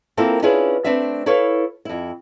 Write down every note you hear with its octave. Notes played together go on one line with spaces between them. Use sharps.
A#3 C4 E4 F4 A4 A#4
C#4 D4 E4 F4 G#4 B4
A3 C4 D4 B4 E5
E4 A4 B4 C#5 F5
F2 E4